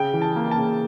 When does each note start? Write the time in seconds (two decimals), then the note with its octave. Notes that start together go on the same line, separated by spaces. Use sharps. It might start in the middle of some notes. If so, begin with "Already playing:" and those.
Already playing: C#3 G5
0.13 E3
0.22 A5
0.36 A#3
0.51 A5
0.58 C#3